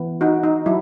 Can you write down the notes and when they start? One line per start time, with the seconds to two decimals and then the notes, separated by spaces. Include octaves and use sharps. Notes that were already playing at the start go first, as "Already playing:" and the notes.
Already playing: E3 B3
0.21 D#4 F#4
0.43 D#4
0.66 F#3 E4